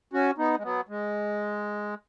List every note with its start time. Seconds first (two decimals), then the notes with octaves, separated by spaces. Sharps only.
0.13 C#4 F#4
0.38 B3 D#4
0.58 G#3
0.63 F#3 B3
0.89 G#3